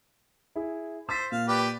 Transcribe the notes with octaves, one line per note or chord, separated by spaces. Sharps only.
E4 G#4
C5 E6 A6 B6
A#2 F5
G4 B4 D5